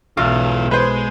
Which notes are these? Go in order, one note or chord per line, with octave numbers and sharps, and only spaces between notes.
B1 E2 G#2 F4 F5
G#3 B4 C5